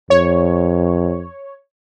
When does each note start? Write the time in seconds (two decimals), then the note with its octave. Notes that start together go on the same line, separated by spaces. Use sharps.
0.10 F2 C#5